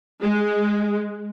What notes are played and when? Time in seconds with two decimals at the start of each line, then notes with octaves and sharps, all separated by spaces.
0.22 G#3